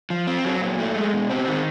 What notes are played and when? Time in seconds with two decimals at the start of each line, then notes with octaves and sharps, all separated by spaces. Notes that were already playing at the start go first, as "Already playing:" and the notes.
0.10 F3
0.27 C4
0.45 F#3
0.61 A#2
0.78 A3
0.96 G#3
1.13 B2
1.30 C4
1.48 D#3